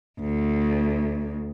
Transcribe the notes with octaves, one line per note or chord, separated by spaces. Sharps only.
D2